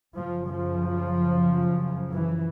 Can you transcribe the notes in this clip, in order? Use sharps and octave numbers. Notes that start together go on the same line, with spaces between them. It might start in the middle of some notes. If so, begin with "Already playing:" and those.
F#2 C#3 F3
F3
E3